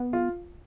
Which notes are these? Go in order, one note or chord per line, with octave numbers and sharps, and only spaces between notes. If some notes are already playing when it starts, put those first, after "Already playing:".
Already playing: B3
F4